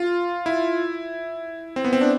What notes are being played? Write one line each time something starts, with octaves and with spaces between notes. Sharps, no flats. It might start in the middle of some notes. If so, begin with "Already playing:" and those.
Already playing: F4
E4
C4
B3
C4
D4